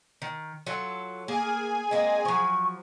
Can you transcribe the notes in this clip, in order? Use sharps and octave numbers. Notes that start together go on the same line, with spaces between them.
D#3
F#3 F4 A4
A#3 G#4 G#5
G#3 A#3 C4 D#5
F3 F#3 C#6